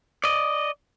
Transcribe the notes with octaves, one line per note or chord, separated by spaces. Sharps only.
D5 D#5